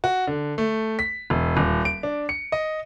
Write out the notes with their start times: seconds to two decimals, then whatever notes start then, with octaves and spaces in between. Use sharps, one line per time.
0.04 F#4
0.27 D3
0.58 A3
0.99 B6
1.30 E1
1.57 D#1
1.85 D7
2.03 D4
2.29 C#7
2.52 D#5